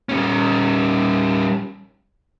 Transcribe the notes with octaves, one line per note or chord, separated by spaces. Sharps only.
G3 C#4